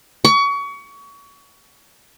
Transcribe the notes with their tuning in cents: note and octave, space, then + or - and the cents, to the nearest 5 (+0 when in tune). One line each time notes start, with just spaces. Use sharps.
C#6 +30